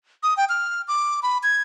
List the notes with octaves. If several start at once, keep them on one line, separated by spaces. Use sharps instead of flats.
D#6
G5
F6
D6
B5
G#6